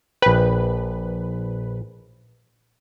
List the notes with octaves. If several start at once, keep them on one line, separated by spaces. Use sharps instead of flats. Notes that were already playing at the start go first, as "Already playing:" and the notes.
A#1 B4 G5